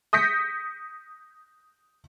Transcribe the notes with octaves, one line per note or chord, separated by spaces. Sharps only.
D#6 G6 A#6 B6 C#7